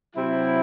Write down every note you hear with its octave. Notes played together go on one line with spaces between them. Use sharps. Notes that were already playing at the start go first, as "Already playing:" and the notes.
C3 F#3 C4 E4